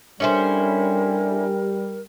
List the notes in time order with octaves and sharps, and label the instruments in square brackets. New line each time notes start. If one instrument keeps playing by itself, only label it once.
[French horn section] G3 [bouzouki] C#4 E4 C5 [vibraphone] D4 A4 G#5 [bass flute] A#4